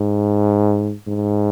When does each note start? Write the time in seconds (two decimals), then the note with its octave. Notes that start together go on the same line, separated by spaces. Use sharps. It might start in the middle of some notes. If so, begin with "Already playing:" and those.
Already playing: G#2
1.07 G#2